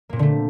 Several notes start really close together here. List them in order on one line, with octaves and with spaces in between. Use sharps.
A#3 A#2 C4 D3 A3